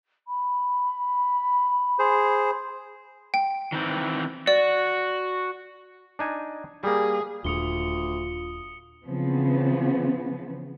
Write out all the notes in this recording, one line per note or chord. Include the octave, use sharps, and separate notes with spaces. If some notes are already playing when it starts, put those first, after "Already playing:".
B5
G#4 C5
G5
D#3 E3 C4
F#4 D5
D4 D#4 G#5
G3 A#3 G#4
D#1 D2 F4 D#6 C#7 G7
C#3 E3 F3 B3 C4